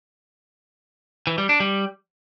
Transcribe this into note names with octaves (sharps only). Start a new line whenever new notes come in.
E3
G3
D4
G3